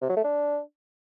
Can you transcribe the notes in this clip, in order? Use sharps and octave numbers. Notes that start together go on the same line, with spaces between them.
C3
F#3
A3
D4